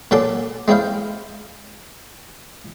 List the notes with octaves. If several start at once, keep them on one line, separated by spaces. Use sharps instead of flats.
A#2 F#3 A4 G#5 C6 D6
G#3 C4 E4 C5 F5